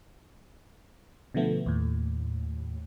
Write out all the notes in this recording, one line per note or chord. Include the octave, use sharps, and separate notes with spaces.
B2 D3 F3 A3 B3
D#2 A2